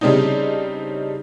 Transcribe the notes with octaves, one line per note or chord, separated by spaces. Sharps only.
C#3 G3 C4 D4 D#4